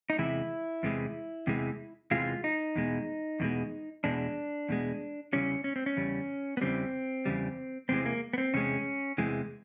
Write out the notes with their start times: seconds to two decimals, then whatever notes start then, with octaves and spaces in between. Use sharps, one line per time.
0.10 D#4
0.18 E2 C3 E3 G#3 E4
0.83 E2 C3 E3 G#3
1.47 E2 C3 E3 G#3
2.11 E2 C3 E3 G#3 F4
2.44 D#4
2.76 E2 B2 G#3
3.40 E2 B2 G#3
4.04 E2 B2 G#3 D4
4.69 E2 B2 G#3
5.33 E2 C#3 E3 G3 C#4
5.64 C#4
5.76 C4
5.86 C#4
5.97 E2 C#3 G3
6.57 B3
6.61 E2 C#3 E3 G3 C4
7.25 E2 C#3 G3
7.89 E2 C3 E3 G#3 C4
8.06 A#3
8.33 B3
8.38 C4
8.53 E2 C3 G#3 C#4
9.18 E2 C3 E3 G#3